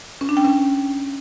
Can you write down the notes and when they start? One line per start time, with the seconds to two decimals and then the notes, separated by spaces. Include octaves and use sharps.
0.21 C#4
0.29 D4
0.37 G5
0.45 C#4